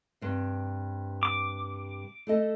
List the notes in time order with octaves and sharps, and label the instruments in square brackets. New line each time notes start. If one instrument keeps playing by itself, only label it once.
[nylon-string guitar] G2 C3
[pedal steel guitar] D6
[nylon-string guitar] A3 A4 D#5